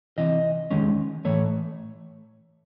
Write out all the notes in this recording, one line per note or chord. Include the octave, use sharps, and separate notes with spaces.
C2 C3 E3 D#5
D#2 D#3 G#3 C#4
A2 E3 A3 C#5